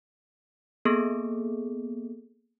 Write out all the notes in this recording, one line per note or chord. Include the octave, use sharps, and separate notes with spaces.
A#3 B3 G#4 A4